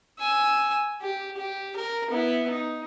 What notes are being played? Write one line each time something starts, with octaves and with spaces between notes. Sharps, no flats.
G#5 E6
G4
G4
A#4
B3 E4
D#4